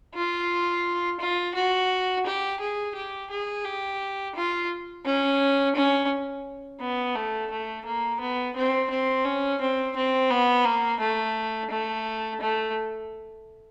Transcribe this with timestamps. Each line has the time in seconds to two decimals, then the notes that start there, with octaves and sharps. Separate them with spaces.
0.15 F4
1.20 F4
1.55 F#4
2.26 G4
2.60 G#4
2.95 G4
3.30 G#4
3.65 G4
4.35 F4
5.06 C#4
5.76 C#4
6.81 B3
7.15 A3
7.51 A3
7.85 A#3
8.21 B3
8.56 C4
8.90 C4
9.25 C#4
9.61 C4
9.96 C4
10.31 B3
10.65 A#3
11.00 A3
11.70 A3
12.41 A3